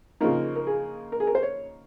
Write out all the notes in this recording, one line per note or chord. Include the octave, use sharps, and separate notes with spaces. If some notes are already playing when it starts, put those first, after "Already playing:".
C#3 F3 A#3 D#4 A#4
A#4
G#4
A#4
G#4
A#4
C5
C#5